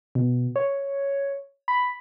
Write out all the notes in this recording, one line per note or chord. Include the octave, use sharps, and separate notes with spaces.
B2
C#5
B5